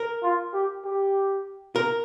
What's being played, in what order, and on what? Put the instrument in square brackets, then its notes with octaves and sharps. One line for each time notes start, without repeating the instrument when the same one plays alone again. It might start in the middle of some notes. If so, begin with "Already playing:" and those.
Already playing: [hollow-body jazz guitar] A#4
[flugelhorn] F4
G4
G4
[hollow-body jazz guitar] A#4